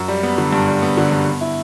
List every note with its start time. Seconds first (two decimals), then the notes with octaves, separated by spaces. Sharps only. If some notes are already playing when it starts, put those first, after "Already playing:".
Already playing: F#2
0.08 G3
0.23 B3
0.38 D3
0.53 G2
0.67 G3
0.82 B3
0.97 D3
1.12 G2
1.26 B3
1.41 E4